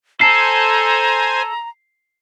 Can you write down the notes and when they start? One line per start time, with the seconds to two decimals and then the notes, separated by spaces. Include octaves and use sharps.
0.21 A4 C5 G#5 A#5 C7